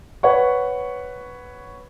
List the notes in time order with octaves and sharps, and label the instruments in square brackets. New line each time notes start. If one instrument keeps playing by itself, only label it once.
[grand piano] B4 C#5 F#5 C#6